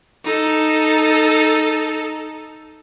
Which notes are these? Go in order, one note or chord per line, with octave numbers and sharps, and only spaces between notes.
D#4 A4